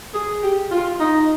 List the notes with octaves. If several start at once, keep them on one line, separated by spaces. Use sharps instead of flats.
G#4
G4
F4
D#4